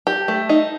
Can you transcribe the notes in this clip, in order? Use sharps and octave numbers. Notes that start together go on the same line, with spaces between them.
G4
A3
D#4